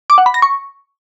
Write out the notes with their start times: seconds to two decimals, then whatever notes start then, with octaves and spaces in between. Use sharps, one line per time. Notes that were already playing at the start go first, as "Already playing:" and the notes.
0.10 D6
0.18 F#5
0.26 B5
0.34 A#6
0.42 C#6